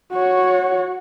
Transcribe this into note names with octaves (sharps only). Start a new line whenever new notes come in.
F#4 C#5